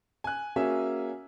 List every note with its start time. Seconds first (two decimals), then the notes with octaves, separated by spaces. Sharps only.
0.24 G#5 F#6
0.56 A#3 C#4 F#4 G#4 E5 G#5